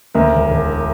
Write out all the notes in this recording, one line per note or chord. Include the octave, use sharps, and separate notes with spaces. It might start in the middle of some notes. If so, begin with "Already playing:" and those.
D2 A#4
E1
E1